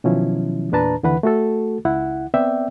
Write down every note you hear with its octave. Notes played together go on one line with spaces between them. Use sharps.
B2 D#3 F3 F#3 C#4 E4
E2 A#2 D4 B4 A5 A#5
D#2 D3 E3 B4 F#5 B5
A3 F#4 A4
C#2 E4 F#5
B3 C4 D5 E5 G5